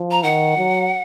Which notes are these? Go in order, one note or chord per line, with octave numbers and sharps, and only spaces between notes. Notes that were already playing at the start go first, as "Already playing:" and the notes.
Already playing: F3
A#5
D#3 F#5
F#3